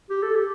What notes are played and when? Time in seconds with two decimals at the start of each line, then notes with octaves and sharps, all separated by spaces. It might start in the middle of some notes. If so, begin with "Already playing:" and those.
0.10 G4
0.23 A4
0.35 G4